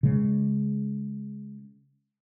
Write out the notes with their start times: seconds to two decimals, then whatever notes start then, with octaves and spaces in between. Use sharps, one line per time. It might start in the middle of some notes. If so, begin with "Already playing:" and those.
0.03 C#3 G#3